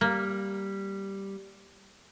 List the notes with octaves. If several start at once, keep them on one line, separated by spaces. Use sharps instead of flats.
G3 A#3